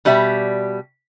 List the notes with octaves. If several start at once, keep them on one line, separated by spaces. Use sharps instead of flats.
B2 G3 D5 E5